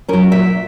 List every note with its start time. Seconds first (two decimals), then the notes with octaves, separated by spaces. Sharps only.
0.08 F#3 C#4 A#4
0.32 A#2 E5